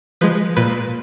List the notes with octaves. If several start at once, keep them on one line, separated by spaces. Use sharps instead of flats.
F3 G#3 B4
A#2 B4